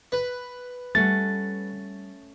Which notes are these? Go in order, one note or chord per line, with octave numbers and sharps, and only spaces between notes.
B4
G3 A3 C#4 F#5 A6